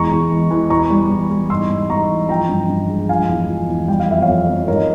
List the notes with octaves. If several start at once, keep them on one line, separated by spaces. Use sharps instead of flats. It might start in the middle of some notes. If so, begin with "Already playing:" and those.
Already playing: E2 G#3 A#5 C#6
E2
E3
E3
E2 A#5 C#6
G3
E2
G3
G#2 C6 E6
G#2
G#2 A#5 C#6
E3
F3 G5 A#5
G2
G2
G#3
F3 F5 G#5
E2
F3
E2
G3 G5
F5
F2 E5
C#5 F5
F2
F2
G#2 A#4 C#5